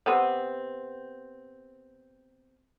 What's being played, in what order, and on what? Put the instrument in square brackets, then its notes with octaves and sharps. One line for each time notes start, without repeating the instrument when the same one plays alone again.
[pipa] C3 B3 C4